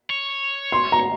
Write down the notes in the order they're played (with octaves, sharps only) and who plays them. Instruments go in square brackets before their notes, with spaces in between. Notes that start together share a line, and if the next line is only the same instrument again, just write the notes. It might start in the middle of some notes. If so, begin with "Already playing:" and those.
[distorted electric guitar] C#5
[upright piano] C6
A#5